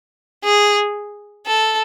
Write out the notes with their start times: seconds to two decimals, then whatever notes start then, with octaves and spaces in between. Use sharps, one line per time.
0.44 G#4
1.47 A4